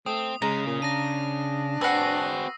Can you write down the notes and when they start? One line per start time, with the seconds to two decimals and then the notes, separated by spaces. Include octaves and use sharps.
0.06 A3 C4 D#6
0.42 C#3 G#3 A#5
0.66 A#2
0.82 D4 A#6 D#7
1.81 C4 F#4 G#4 B4 E6 A#6 C7